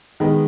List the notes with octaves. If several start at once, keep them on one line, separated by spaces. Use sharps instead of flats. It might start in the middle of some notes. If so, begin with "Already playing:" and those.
D#3 G#3 B3